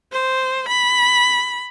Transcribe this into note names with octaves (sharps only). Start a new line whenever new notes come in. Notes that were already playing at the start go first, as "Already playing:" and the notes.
C5
B5